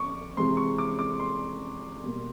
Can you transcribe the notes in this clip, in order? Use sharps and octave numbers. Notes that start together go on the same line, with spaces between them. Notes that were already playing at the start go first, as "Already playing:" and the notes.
Already playing: C#6 D6
C3 E3 G#3 C4 C6
C#6
D6
D6
C6
B2 G3 A#3